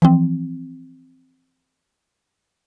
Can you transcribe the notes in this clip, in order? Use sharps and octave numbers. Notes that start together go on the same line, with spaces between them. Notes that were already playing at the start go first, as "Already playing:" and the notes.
E3 F3 C4